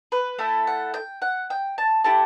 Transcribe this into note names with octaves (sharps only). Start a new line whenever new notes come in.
B4
A3 E4 A4
F#5
G5
F#5
G5
A5
A3 E4 G4 A5